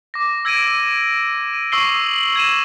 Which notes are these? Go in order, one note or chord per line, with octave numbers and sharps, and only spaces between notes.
D6 A#6
E6 G#6 A#6 D7 D#7
D#7
C#6 D#6 E6 C7 G7
F#7
G#6 A#6 D#7 E7